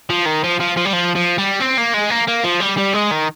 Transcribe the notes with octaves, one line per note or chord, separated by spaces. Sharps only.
F3
D#3
F3
F3
F3
G3
F3
F3
G3
C4
A#3
G#3
A#3
A#3
F3
G3
G3
G#3
D#3